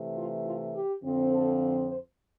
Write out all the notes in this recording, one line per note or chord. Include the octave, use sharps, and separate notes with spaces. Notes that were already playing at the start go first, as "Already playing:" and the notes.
Already playing: C3 E3 A3
F4
F4
G4
F2 D3 F3 C4
A4
C5